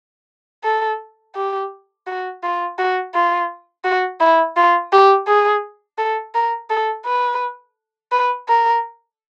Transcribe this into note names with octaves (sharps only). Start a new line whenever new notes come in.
A4
G4
F#4
F4
F#4
F4
F#4
E4
F4
G4
G#4
A4
A#4
A4
B4
B4
A#4